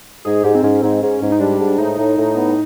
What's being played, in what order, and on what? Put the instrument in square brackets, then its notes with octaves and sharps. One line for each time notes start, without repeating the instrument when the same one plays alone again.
[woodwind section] G#2 [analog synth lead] G#4
[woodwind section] G#2 [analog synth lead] G4
[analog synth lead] C4
[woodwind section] G#2 [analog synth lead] C#4
[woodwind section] G#2 [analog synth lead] C4
[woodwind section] G#2 [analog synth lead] C#4
[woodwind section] G#2
[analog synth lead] D#4
[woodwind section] G3 [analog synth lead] D4
[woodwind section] G#2
[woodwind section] A2 [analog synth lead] D#4
[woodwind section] A2
A2
B3